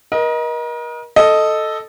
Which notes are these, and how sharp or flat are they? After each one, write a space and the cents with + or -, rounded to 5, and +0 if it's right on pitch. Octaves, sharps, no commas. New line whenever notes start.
A#4 +40 D#5 +10
A4 +0 D#5 +0